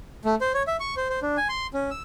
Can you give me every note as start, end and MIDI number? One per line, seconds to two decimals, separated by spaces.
0.25 0.35 57
0.41 0.52 72
0.54 0.63 73
0.67 0.77 76
0.80 0.95 85
0.97 1.08 72
1.10 1.20 72
1.22 1.37 62
1.37 1.48 80
1.49 1.67 84
1.74 1.90 61
1.91 2.03 88